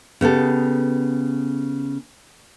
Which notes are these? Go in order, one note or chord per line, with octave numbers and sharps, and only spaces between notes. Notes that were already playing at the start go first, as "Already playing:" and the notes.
C#3 B3 G4 A4